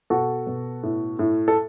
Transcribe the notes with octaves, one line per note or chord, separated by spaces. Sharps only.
B2 F#4 A4
B2
A2
A2
A4